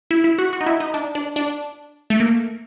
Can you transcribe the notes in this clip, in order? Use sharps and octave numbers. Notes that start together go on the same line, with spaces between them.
E4
E4
F#4
F#4
D#4
E4
D#4
D4
D4
D4
A3
A#3